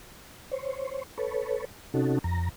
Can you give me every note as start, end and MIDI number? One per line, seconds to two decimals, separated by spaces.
0.52 1.03 72
0.52 1.03 73
1.18 1.65 69
1.18 1.65 71
1.18 1.65 73
1.94 2.19 48
1.94 2.19 61
1.94 2.19 63
1.94 2.19 66
1.94 2.19 69
2.24 2.49 41
2.24 2.49 82